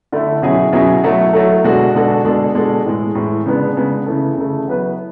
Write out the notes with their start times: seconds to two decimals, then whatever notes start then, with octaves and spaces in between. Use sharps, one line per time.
0.12 D3 A3 E4
0.42 B2 F#3 C#4 E4 G#4
0.73 B2 F#3 C#4 E4 G#4
1.04 F#3 A3 E4 A4
1.33 F#3 A3 E4 A4
1.64 B2 G#3 D4 F#4 A4
1.95 B2 G#3 D4 F#4 A4
2.25 B2 G#3 D4 A4
2.55 B2 G#3 D4 A4
2.85 A2 E3 G#3
3.15 A2 E3 G#3
3.46 C#3 G#3 B3 D4
3.77 C#3 G#3 B3 D4
4.06 C#3 E3 A3
4.37 C#3 E3 A3
4.68 F#3 B3 E4 B4